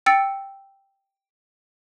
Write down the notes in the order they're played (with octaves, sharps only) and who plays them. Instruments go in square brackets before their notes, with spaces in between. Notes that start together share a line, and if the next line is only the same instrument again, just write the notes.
[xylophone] G5 E6 A6 C#7